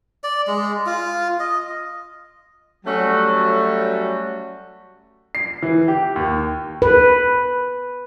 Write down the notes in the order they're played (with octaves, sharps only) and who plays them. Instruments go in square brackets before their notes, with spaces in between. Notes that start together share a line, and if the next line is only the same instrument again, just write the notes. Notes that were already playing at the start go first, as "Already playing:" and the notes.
[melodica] D5
G#3
F4
D#5
[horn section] F#3 G3 A3 C#4 F#4
[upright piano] C7
E3
G4
D#2
[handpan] B4